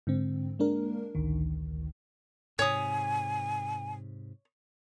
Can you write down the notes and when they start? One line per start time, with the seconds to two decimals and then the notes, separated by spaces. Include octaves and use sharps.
0.07 G#2 D3 C4
0.59 G#3 A#3 D4 A#4
1.15 A1 D2 D#3
2.59 G#2 C3 C#5 G#5 D#6